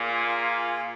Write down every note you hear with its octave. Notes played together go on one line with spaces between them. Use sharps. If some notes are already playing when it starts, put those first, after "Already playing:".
Already playing: A#2 F4 G#4 F5 G#5